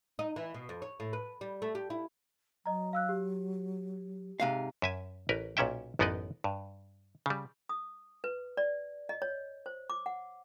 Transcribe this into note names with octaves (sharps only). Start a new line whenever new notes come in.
D#4
E3
B2
F2
C#5
A2
B4
G3
A3
G4
E4
F#3 D#5 A#5
F5 E6 F#6
G4
G#2 C3 F5
F#2 E5 G#5
A1 A#4 B4
B1 A#2 C#4 E5 G5
A1 F#2 B3 D#4 D5 D#5
G2
C#3 G3
D#6
B4
D5
D#5
C#5
C5
D6
F#5